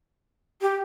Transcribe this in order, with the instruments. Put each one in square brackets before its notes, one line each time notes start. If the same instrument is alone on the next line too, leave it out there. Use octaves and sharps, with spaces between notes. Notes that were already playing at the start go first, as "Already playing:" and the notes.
[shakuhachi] G4